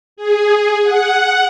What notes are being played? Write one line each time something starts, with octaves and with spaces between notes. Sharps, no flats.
G#4
F#5